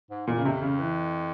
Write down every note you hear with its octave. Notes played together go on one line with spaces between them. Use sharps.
G#2
F2 A#2
C#3
F2 C3
C#3
E3